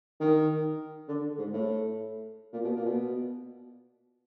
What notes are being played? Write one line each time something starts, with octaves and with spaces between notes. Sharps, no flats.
D#3
D3
G#2
A2
A#2
B2
A#2
B2